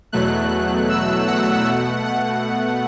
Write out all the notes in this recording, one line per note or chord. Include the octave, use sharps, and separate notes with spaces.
E2 B2 F#3 A3 F#6
E6
F#5
B2 A3
F#5